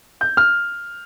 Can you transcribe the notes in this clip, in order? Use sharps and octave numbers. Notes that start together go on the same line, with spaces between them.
G6
F6